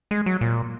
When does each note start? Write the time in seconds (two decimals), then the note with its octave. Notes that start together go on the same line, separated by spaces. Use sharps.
0.11 G#3
0.26 F#3
0.41 A#2